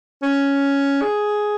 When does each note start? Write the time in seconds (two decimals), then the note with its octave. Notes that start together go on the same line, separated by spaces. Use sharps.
0.22 C#4
1.01 G#4